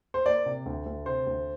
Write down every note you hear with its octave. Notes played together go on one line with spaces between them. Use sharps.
C5
A#3 D5
C3
D2
D2
C3 C5
D2